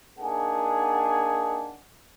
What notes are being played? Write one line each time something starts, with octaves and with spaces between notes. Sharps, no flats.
A#3 D4 D#4 G#4 F#5 G#5